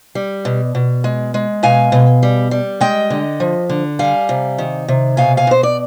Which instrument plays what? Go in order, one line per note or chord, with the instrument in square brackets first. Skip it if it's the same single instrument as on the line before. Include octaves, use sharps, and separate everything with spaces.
[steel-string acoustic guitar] G3
B2
B2
G#3
G#3
B2 F5 G#5
B2
G3
G3
G#3 D#5 G5
D3
F3
D3
G3 F5 G#5
C3
D#3
C3
B2 F5 G#5
F5 G#5
B2 C5
D5